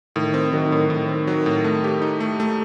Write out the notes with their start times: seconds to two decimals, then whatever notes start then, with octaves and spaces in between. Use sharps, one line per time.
0.16 A2 D#3
0.34 C4
0.53 D#3 F#3
0.72 A2
0.90 A2 D#3
1.09 C4
1.27 F#3
1.46 A2
1.64 A3
1.84 G4
2.02 D#4
2.20 A3
2.40 A3